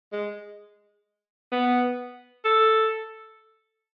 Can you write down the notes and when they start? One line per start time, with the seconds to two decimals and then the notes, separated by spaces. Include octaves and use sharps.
0.13 G#3
1.52 B3
2.45 A4